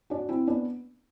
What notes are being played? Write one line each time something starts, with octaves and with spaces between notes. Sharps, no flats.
D4 F#4
C4 E4
B3 D4